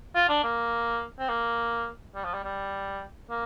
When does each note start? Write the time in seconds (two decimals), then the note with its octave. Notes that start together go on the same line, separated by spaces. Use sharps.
0.15 F4
0.29 D4
0.44 A#3
1.19 C4
1.29 A#3
2.15 G3
2.25 F3
2.34 G3
2.44 G3
3.30 A#3